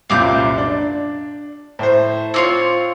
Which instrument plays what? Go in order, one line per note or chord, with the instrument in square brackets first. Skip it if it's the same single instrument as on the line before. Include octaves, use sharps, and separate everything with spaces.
[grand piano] C2 F#2 A#2 [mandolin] F5 D6 G6
[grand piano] D4
A2 C5
[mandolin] C4 F4 C#5 [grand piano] D6